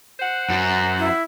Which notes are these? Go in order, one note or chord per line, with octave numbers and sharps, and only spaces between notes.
C5 F#5
F#2
E4